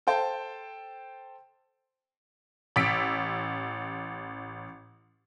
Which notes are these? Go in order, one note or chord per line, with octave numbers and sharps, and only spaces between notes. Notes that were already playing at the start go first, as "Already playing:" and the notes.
A4 C5 G5 A5
A1 E6 B6 D7